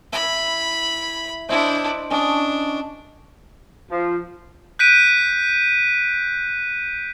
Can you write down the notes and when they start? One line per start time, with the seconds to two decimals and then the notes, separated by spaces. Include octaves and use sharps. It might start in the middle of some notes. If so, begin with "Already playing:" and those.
0.13 E4 B5
1.49 D4 E4 C5 D#5
2.10 C#4 D4 D#5 A5
3.90 F3
4.79 F#6 G6 B6 D7 D#7